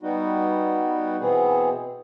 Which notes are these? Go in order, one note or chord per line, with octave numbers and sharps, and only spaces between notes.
G3 B3 D#4 F#4
B2 E3 B3 C4 G#4